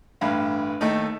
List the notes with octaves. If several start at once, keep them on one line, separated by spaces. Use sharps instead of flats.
A1 G2 F5
D#2 A3 D#4